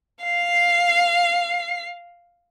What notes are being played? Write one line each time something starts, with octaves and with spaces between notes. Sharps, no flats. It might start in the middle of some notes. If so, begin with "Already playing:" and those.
F5 C7